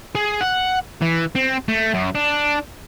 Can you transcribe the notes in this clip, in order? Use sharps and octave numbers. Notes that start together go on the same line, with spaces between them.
G#4
F#5
E3
C4
A3
F#2
D4